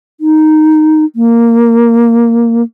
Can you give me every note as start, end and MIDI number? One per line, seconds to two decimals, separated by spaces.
0.21 1.05 63
1.16 2.62 58